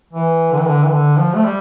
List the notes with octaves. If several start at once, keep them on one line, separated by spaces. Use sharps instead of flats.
E3
D3
E3
D3
E3
D3
F3
A3
G3